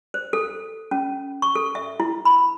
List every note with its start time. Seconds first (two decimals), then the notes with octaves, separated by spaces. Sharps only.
0.14 C5
0.33 A4
0.91 C#4
1.42 C#6
1.55 A4
1.75 E5
2.00 E4
2.25 B5